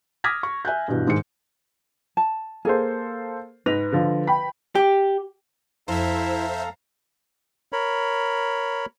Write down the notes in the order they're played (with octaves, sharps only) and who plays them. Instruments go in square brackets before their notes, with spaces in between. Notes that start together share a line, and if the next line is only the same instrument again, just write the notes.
[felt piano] D6 D#6 F6 G#6 A#6 B6
C#6
E5 G#5 F#6 G6
G2 B2 E3
G#2 D#3 G#3 C#7
[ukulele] A5
[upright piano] A#3 A4 C5 [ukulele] G#4
[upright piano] G#2 A#6 F7 [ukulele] B4
[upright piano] D3 F3
G5 B5
[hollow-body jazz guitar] G4
[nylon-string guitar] F2 [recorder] E4 [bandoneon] A4 F5 A#5 [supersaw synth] C5 E5
[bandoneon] A#4 C#5 B5